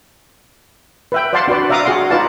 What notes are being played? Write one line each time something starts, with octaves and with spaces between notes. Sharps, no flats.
B4 E5 G5
C5 D5 F5 F#5 A5 C6
D4 F#4 B4 D5
D5 E5 F5 A#5 D6 D#6
F#4 G#4 F5 F#5 C6
D#4 F4 B4 D5 F5 A5